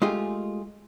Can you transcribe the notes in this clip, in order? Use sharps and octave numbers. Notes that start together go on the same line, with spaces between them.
G#3 A3 F4 G4 G#4